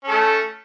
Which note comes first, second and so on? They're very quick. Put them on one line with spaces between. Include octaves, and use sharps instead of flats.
C#4 A4 A3